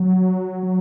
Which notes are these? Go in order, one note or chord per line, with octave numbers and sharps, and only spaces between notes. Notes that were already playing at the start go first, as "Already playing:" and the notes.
Already playing: F#3
F#3